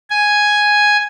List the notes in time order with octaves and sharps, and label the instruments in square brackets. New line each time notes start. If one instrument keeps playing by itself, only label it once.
[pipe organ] G#5